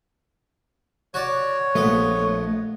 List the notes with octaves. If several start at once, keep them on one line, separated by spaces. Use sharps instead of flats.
F#4 C#5 D5
A#1 A3 B3 D#5